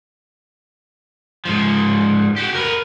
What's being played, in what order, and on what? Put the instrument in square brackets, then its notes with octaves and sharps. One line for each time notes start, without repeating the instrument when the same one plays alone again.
[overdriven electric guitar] G#2 F3
F#4 G4
A#4 B4